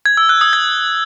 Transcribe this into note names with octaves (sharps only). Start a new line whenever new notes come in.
G#6
E6
F#6
D#6
G#6